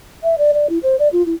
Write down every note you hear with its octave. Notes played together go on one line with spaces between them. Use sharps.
E5
D5
D5
E4
C5
D5
F4
E4